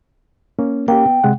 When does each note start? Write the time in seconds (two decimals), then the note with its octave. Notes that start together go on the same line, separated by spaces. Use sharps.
0.59 A#3 C#4
0.88 A#3 C#4 G4 G5
1.06 B3
1.24 C3 G#3 F#5